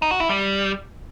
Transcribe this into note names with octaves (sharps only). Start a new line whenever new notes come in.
D#4
F#4
E4
G3